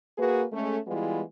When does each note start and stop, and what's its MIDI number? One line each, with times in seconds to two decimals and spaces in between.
0.18 0.44 58
0.18 0.44 66
0.18 0.44 68
0.18 0.44 71
0.52 0.77 56
0.52 0.77 57
0.52 0.77 61
0.87 1.22 52
0.87 1.22 55
0.87 1.22 56
0.87 1.22 59
0.87 1.22 64
0.87 1.22 65